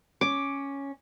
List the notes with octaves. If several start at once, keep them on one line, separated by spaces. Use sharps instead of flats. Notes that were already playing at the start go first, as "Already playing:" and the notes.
C#4 D6